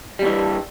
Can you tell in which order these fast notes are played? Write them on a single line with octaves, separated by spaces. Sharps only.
G3 E2 E3 G2